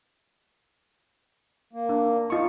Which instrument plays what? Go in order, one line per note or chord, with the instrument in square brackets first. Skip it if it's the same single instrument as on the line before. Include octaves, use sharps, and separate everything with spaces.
[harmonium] A#3
[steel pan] D4
[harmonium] D#4 [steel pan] F4 C#6